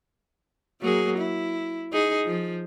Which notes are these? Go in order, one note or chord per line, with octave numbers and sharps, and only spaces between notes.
F#3 A#3 G#4
E4
D#4 G#4
F3